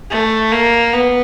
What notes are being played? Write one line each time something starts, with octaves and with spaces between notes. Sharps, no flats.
A3
A#3
B3